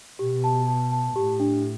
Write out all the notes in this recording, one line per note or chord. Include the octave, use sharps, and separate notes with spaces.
B2 G4
A5
A5
A5
A2 G4
D4